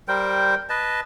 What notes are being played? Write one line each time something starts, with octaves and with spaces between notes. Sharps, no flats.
G3 A#4 C5 G5
B4 D#5 A5